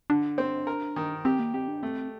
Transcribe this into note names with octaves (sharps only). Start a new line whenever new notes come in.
D3 D4
C4
A#4
D#3
C4 G4
A#3
C4 G4
D4
A3 C4